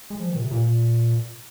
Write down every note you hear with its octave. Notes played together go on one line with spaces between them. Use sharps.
G#3
F3
D#3
A#2
C3
A#2